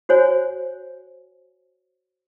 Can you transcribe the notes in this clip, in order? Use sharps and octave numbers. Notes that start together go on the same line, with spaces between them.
F#4 C5 C#5 G#5